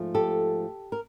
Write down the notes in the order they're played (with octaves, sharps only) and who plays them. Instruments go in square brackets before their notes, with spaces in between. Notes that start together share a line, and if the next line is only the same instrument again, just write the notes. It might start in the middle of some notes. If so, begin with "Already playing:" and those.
Already playing: [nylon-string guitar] G#2 F3 A3
G4 A4
A#4